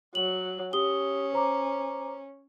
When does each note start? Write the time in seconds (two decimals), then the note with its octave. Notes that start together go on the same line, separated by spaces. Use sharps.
0.15 F#3 F#7
0.73 C#4 G4 D#6 G7
1.33 C5 A#5 D6